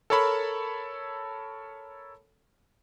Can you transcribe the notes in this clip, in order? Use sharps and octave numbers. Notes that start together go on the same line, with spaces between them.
A4 A#4 C#5 A5 B5